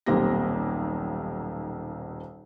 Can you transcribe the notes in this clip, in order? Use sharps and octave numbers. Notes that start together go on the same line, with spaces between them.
D#1 B1 A#3 C4 G4 A#6